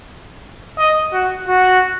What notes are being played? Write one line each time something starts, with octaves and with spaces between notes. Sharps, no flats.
D#5
F#4
F#4